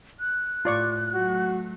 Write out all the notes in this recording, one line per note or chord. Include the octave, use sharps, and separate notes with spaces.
F#6
A2 F4 D5 C#6
F#3 A3 F#4